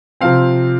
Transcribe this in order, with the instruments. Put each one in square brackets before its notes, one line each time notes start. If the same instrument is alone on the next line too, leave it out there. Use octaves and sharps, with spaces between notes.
[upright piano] C3 F3 C4 F5